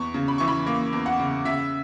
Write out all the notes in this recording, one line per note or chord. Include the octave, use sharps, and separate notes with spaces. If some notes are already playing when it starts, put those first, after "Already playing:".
Already playing: E2 C#6
C#3
B5
E3 C#6
B5
A#3
E2
F#5
C#3
C#3 E5